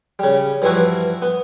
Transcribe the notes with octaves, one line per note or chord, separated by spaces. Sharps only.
C#3 G3
G2 E3 F3 E4 F#4
B3